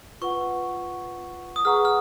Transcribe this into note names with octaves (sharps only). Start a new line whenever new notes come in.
F4 B4 F#5 C#6
D#6
G#4 B4 F#5 A#5 C#6 F6
F6